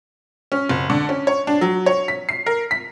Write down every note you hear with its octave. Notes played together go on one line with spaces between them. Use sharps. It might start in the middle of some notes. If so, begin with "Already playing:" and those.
C#4
F#1
D3
C#4
C#5
D4
F#3
C#5
B6
C7
A#4
B6